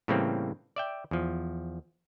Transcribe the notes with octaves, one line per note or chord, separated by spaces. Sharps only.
A2 C#3 E3 G3 A#3 C4
D5 E5 G5
E2 F3